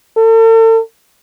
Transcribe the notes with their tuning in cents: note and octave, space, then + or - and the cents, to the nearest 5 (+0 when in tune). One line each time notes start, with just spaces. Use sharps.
A4 +40